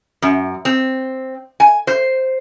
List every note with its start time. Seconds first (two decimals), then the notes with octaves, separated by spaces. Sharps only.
0.22 F#2
0.65 C4
1.60 G#5
1.87 C5